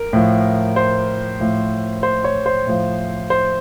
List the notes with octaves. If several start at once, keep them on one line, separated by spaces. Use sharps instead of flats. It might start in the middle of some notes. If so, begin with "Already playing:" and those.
Already playing: A#4
A2 F3
C5
A2 F3
C5
C#5
C5
A2 F3
C5